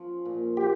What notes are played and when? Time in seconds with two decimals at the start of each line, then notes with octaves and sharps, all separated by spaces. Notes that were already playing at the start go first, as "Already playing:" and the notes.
Already playing: F3 C#4
0.25 A#2
0.57 A#3 G4